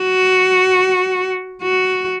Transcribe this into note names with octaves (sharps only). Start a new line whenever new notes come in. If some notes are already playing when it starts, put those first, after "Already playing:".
Already playing: F#4
F#4